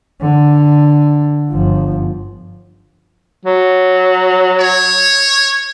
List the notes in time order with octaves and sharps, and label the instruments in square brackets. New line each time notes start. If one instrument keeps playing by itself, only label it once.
[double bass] D3
G1 F3
[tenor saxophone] F#3
[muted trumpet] C#5